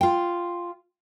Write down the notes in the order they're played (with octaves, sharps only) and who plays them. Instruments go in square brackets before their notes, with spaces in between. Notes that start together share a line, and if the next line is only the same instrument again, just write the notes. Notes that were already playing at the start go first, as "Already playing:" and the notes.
[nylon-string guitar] F4 G5